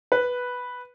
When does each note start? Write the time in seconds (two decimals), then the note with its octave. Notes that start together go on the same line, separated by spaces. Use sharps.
0.12 B4